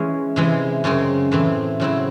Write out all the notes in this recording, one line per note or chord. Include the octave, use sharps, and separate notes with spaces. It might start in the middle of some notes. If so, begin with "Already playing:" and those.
Already playing: E3 G#3 C#4
C3 E3 G#3
F#2 C#3 G#3 C4
A2 E3 C4
C#3 F#3 C4 E4